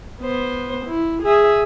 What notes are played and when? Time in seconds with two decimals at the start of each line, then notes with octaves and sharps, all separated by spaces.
0.21 B3 C5
0.86 E4
1.23 G#4 E5